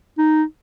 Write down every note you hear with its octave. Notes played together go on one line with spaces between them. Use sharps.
D#4